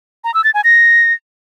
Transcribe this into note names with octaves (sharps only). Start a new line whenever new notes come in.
A#5
E6
A6
G#5
A#6